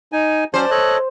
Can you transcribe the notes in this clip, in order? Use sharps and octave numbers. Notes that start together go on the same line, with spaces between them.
D#4 G#5
F#3 C#4 C5 D5 A5
A4 C#5 D#5 F#6